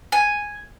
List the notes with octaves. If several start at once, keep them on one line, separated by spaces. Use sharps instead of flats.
G#5